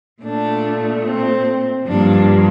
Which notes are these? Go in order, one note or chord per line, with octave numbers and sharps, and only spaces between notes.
A#2 A3 D4
C4
G2 F3 A#3 D4